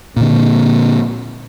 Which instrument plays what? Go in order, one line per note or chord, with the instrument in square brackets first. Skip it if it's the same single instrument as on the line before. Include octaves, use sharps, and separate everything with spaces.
[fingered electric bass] A#2 D3